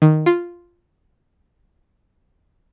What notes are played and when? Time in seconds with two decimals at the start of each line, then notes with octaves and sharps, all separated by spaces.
0.02 D#3
0.26 F4